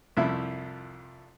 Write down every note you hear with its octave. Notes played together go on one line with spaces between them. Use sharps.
C2 F2 F3 E4